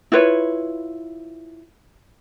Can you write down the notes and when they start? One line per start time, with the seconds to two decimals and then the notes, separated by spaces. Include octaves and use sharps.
0.12 E4 F4 B4 C#5